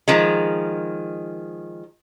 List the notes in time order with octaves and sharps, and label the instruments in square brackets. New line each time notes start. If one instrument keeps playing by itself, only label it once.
[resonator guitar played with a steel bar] D#3 F3 G#3